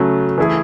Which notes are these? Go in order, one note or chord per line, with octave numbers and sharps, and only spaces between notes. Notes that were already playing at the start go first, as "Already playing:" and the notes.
Already playing: C#3 F#3 A3
E3 A3 E4 G#4